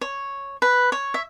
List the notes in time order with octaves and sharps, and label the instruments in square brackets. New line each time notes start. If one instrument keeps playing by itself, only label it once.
[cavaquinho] C#5
B4
C#5
E5